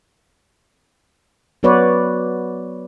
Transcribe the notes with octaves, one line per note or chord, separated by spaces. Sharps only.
F#3 B3 F#4 B4 C#5 D5